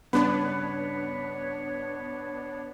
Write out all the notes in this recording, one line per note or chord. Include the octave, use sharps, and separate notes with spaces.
G2 C#3 B3 D4 B4 C#5